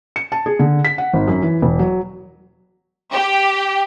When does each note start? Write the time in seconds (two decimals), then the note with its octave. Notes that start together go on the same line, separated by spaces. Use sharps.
0.16 C#7
0.32 A5
0.46 G#4
0.59 D3
0.85 B6
0.98 F#5
1.13 G#1
1.28 F#2
1.42 E3
1.62 E1
1.79 F#3
3.11 G4